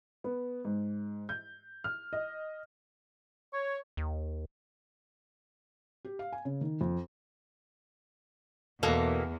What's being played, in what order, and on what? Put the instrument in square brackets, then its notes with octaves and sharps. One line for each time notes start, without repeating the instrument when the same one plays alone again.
[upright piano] B3
G#2
G6
F6
D#5
[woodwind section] C#5
[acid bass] D#2
[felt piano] G4
F5
G#5
C#3
D#3
F2
[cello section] E2 [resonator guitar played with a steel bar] B2 A#3 A4